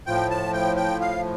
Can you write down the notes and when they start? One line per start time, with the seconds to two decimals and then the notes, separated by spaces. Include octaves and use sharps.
0.06 A2 F3 G5
0.30 A5
0.53 G5
0.76 G5
1.00 F5